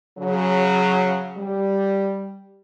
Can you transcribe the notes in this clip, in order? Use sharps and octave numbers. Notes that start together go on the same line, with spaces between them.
C#3 F#3
G3